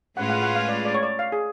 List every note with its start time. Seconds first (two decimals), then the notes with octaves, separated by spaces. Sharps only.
0.17 A2 G#3 C#4 F4 B4 F#5
0.30 F#5
0.43 F#5
0.55 F5
0.69 D5
0.85 D5
0.94 C#5
1.03 D5
1.19 F5
1.32 G#4